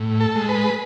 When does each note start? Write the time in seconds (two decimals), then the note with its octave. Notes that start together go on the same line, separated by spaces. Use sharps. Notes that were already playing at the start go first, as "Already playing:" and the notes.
Already playing: A2
0.21 A4
0.35 G#3
0.49 B4